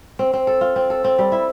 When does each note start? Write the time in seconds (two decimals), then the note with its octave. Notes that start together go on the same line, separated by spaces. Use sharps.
0.19 C4
0.33 C4
0.47 A4
0.61 F4
0.76 C4
0.90 A4
1.04 C4
1.18 G3
1.32 E4